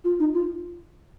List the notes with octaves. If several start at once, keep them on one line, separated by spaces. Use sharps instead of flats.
F4
D#4
F4